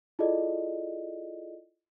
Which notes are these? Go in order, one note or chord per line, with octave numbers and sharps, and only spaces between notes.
E4 F4 G#4 A4 D5 D#5